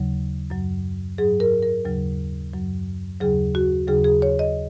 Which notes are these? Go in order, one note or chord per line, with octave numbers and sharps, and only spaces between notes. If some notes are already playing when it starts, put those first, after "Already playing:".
Already playing: D#2 C#3 F#3
F#2 F#3
G#2 F#3 G#4
A#4
A#4
D#2 C#3 F#3
F#2 F#3
D#2 C#3 F#3 G#4
F#4
D#2 C#3 F#3 G#4
G#4
C#5
D#5